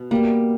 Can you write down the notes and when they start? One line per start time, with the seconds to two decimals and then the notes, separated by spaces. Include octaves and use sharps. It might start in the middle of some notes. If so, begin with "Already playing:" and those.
Already playing: B2 B3
0.11 G3 A#3